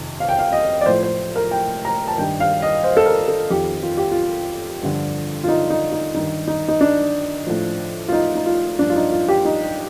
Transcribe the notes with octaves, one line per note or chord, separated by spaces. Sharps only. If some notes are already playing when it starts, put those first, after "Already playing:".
Already playing: F2 C3 D#3
F5
G5
F5
D#5
D5
A2 F3 C5
C5
A#4
G5
A#5
A5
G2 D#3 G5
F5
D#5
C5
A4
A#4
A4
F2 D#3 G4
F4
G4
F4
G2 D3 F3
F4
D#4
D#4
D#4
G2 D#3 D#4
D#4
D#4
D4
A2 F3
F4
D#4
D#4
F4
G2 F3 D4
F4
D#4
F4
G4
D#4